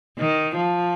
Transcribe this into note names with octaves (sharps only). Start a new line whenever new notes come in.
D#3
F3